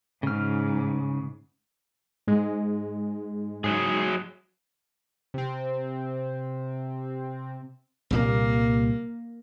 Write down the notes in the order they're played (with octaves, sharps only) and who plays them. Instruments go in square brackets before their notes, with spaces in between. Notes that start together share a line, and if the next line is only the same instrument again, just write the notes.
[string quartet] G#2 [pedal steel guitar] C#3 F6
[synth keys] G#2 G#3
[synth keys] G#2 [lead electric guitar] F#3 G#4
[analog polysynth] C3 C4
[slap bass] C2 A#2 G3 [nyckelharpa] A#3